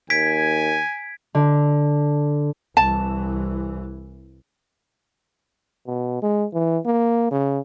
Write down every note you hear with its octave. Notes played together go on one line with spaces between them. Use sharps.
D#2 G#5 G#6 B6 D7
D3
C2 E3 A5
B2
G#3
E3
A#3
C#3